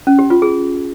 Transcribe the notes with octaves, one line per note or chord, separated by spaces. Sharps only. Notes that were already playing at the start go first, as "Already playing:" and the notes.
C#4
G4
F4
G#4